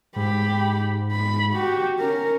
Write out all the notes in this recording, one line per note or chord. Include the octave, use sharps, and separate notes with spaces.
G#2 G4 B5
B5
F#4 G4
C#4 A#4